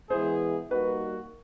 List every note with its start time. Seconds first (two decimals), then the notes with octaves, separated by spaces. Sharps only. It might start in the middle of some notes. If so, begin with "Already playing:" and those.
0.10 E3 G#3 B3 E4 G#4 C5
0.70 G3 A#3 D#4 F#4 B4